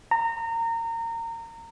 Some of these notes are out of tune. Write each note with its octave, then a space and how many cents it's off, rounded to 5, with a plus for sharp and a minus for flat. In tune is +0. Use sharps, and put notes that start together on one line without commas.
A#5 -25